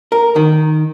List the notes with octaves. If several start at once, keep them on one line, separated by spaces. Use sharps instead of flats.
A#4
D#3